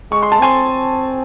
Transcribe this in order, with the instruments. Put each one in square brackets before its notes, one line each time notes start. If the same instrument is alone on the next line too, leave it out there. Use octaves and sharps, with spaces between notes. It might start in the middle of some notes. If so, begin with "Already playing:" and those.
[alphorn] G#3 [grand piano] C#6
[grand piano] C6
A5
[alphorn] C4 [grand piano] G#5 C6